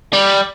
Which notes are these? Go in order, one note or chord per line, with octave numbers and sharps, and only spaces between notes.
G3